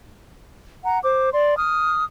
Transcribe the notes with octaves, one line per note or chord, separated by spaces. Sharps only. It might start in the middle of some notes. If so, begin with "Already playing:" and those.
F#5 A#5
C5 D6
D5 C6
D#6 F6